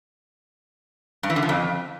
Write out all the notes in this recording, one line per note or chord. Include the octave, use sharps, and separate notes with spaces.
G2
E3
D3
F3
F2